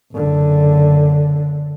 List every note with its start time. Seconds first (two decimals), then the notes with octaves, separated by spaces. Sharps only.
0.13 F#1 D3